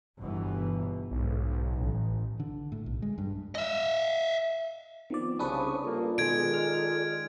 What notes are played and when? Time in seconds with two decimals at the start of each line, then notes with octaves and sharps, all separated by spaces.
0.18 G1 B2 E3
1.11 B1 G#2
1.72 A1
2.40 D3
2.72 A2
2.86 B1
3.02 G#3
3.18 G2
3.55 D#5 E5
5.10 D#3 F3 B3 C4 D5
5.39 C2 C#3 C#4 D4 B4 C5 C#6 D#6
5.84 G2 A#3 F4 A4 D5
6.18 B2 D#3 G#3 G#6 D7
6.54 F6